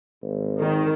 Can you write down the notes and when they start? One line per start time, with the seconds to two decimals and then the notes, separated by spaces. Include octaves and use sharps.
0.22 G#1
0.59 D#3